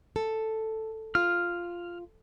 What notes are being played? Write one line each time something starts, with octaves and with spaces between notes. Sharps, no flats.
A4
F4 F6